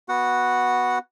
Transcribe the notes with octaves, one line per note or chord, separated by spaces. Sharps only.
B3 F#4 F#5